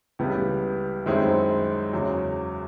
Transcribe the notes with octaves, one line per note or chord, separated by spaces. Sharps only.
C#2 C#3 E3 G3 B3
F#2 D#3 G#3 C4 E4
E2 C#3 F#3